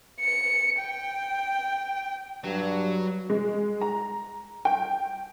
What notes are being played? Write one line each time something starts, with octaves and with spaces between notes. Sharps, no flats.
C#7
G5
G2 F#3
G#3
A#5
G5